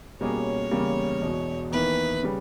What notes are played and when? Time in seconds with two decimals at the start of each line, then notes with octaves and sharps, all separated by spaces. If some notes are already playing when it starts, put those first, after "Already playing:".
0.21 B2 G3 A#3 C#4 G#4 C#5
0.71 E2 C#3 G3 A#3
1.21 E1 E2 B2
1.71 E2 D#3 A#3 E4 B4
2.23 C#3 G3